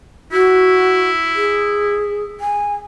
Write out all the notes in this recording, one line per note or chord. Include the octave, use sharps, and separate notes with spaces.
E4 F#4
G#4
G#5